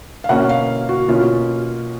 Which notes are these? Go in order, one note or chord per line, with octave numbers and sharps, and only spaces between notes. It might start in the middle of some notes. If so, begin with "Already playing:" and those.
F5
B2 A#3 C#4 F#5
F5
F#4
B2 A#3 C#4 F4